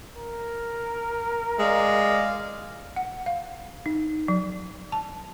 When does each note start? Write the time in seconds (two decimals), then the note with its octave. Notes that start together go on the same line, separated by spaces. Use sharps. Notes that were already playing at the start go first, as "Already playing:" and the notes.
0.16 A#4
1.59 G#3 D5 F5
2.96 F#5
3.26 F5
3.86 D#4
4.28 F#3
4.92 A5